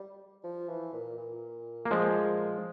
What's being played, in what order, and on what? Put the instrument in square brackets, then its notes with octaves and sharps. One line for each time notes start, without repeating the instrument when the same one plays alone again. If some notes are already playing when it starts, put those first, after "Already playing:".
Already playing: [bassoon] G3
F3
E3
A#2
A#2
[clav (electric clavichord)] A#3
F3 G#3